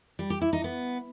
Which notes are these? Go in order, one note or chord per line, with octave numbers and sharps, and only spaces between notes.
G3
G4
E4
D#4
B3